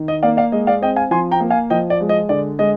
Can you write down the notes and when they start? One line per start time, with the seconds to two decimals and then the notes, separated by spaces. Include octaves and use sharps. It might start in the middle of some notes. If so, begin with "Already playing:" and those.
Already playing: D#3
0.08 D#5
0.23 A#3 D5 F5
0.37 D5 F5
0.52 G#3 D#5
0.67 D5 F5
0.81 C4 D#5 G5
0.96 F5 G#5
1.11 F3 G#5 C6
1.31 G5 A#5
1.40 A#3
1.50 F5 G#5
1.70 F3 D#5 G5
1.90 D5
2.01 G#3
2.09 D#5
2.29 D3 D5
2.59 G#3 D#5